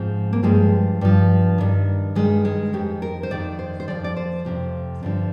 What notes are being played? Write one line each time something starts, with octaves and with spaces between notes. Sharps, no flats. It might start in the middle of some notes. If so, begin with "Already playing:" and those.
Already playing: G#2 F3 C4
A#3
G2 F3 G#3
G2 F3
G2 D#3
G2 D#3 G#3
G#3
F2 D#3 G4
A#4
C5
F2 D#3 D5
C5
C5
F2 C3 F3 D5
D5
C5
F2 C3 F3
G2 D3 F3